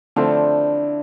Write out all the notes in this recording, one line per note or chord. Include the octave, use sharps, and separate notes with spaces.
D3 F3 A3 C4 D4 E4